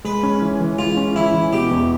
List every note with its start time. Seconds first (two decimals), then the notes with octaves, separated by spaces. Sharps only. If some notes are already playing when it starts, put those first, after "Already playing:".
0.04 G#3 B4
0.23 C#4
0.42 E3
0.61 E3
0.79 G#3 F4
0.97 C#4
1.15 E3 E4
1.34 E3
1.53 B2 G4
1.71 E2